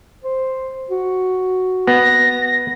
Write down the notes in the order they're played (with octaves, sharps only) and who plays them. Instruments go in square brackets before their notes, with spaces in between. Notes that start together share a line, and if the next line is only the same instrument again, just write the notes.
[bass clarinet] C5
F#4
[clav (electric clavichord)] B3 [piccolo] A#6